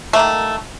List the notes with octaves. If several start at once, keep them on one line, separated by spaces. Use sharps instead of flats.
D#3 A3 A#3